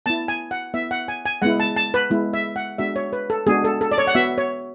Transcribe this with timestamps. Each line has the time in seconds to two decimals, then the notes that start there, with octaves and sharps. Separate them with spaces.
0.06 B3 E4 A5
0.28 G#5
0.51 F#5
0.74 B3 E4 E5
0.91 F#5
1.08 G#5
1.25 G#5
1.42 G#3 B3 E4 F#5
1.60 A5
1.76 A5
1.94 B4
2.10 G#3 B3 E4
2.34 E5
2.56 F#5
2.78 G#3 B3 D4 F#4 E5
2.96 C#5
3.13 B4
3.30 A4
3.47 G#3 B3 D4 F#4 G#4
3.64 A4
3.81 A4
3.91 D5
3.98 C#5
4.07 F#5
4.15 B3 F#4 E5
4.38 C#5